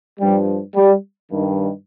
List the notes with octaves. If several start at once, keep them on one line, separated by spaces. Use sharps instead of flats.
G2 F3 G3
G3
G2 D#3